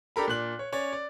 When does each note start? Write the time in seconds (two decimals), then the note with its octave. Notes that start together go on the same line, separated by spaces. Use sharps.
0.16 D4 G4 A4 A#4 B5
0.27 A#2 D4 F#6 F#7
0.59 C#5
0.72 C#4 C#5 D5
0.93 D5